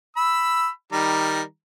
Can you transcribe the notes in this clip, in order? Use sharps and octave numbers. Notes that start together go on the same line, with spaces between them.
B5 E6
D#3 G3 A#5